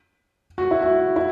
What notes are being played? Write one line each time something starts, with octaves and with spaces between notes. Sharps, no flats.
F#4
E4
F#4
E4